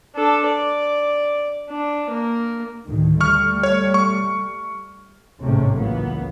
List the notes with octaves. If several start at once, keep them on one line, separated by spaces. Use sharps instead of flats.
D4 A4
D5
D4
A#3
D2 A2 D#3
G3 A3 C#6 F6
C#5
C#6
A1 D#2 G#2 C3 A3 C#4
C#2 E3 F#3 A#3 B3